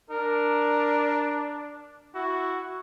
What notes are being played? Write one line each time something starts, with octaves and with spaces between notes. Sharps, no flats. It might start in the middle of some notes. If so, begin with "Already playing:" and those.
D4 A#4
E4 F#4